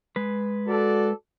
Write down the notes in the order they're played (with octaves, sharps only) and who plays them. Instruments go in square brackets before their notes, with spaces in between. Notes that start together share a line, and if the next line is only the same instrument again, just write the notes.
[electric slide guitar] G#3 B4
[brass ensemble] F#4 A4 D5